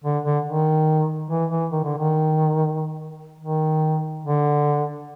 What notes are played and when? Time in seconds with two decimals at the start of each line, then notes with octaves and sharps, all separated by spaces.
0.04 D3
0.24 D3
0.46 D#3
1.31 E3
1.50 E3
1.72 D#3
1.84 D3
1.98 D#3
3.40 D#3
4.24 D3